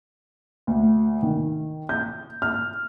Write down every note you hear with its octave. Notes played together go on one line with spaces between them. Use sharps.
D2
D#3
G6
F6